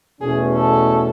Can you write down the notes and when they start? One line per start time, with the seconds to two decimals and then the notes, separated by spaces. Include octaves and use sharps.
0.20 E2 B2 A3 C#4 G#4
0.54 A4